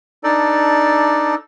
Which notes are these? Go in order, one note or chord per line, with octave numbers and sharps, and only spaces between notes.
D4 D#4 A4 D5